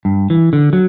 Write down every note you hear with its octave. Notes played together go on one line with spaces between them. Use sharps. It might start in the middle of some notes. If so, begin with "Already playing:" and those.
G2
E3
D3
F#3